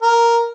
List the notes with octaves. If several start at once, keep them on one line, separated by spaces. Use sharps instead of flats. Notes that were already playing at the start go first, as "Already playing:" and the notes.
A#4